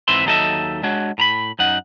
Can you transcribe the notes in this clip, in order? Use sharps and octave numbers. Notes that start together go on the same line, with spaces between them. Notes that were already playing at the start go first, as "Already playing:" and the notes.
G#2 E3 C4 B4 E5 C6
D#2 F#3 D#4 A4 D#5 E5
G#3 D4 F#4 C#5
A2 A#5 B5
F#2 D#4 F#5